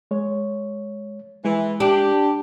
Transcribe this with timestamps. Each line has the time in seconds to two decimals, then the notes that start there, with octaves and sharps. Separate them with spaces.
0.11 G#3 C#5
1.44 E3 G#3
1.80 D4 G4